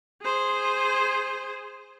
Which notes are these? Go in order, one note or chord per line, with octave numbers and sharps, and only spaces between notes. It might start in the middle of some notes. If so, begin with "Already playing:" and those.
G#4 C5